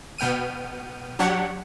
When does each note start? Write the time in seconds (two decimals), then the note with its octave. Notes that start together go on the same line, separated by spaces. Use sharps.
0.18 B2 B3 G5 F6 D#7
1.19 F#3 D4 G4 C#5 F#5